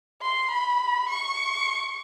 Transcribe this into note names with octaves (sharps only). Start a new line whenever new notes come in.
C6
B5
C#6